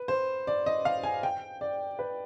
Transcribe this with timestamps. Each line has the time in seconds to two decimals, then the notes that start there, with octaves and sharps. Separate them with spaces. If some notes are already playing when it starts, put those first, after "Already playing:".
Already playing: B4
0.08 C5
0.47 D5
0.66 D#5
0.85 F5
1.04 G#5
1.23 G5
1.61 D5
1.99 B4